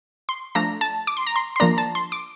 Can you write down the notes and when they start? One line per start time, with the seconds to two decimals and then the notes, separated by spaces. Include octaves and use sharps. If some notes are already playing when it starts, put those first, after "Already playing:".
0.29 C6
0.55 F3 A3 D4 A#5
0.81 A5
1.07 D6
1.17 C6
1.27 A#5
1.36 C6
1.56 C6
1.60 F3 A#3 D4 A#5
1.78 A5
1.95 C6
2.12 D6